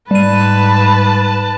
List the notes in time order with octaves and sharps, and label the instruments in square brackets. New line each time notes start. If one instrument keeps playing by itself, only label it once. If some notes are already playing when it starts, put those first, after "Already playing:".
[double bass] G#2 [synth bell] G3 D#7 [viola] B4 A5